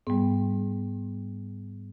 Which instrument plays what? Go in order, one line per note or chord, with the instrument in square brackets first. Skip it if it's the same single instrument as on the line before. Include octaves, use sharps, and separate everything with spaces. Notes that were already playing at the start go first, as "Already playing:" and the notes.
[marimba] G#2 G3 B3